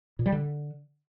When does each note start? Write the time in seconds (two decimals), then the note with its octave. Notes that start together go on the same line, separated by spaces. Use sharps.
0.19 A#2
0.26 G3
0.32 D3